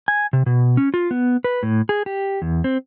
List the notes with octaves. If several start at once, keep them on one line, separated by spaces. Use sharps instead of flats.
G#5
C3
B2
C#4
F4
B3
B4
A2
G#4
G4
E2
C4